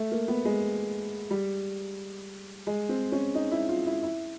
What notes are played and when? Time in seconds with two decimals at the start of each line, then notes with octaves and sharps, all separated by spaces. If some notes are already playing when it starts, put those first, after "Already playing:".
Already playing: A3
0.12 A#3
0.28 B3
0.45 G#3
1.30 G3
2.67 G#3
2.89 C4
3.12 C#4
3.35 D#4
3.52 E4
3.69 F4
3.86 E4
4.03 E4